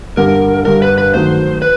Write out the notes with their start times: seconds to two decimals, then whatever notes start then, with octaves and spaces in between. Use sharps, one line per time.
0.17 G2 D3 G3 A#4
0.65 G2 D3 G3 A#4
0.82 B4
0.98 B4
1.14 D#3 F#3 A3 C5
1.62 B4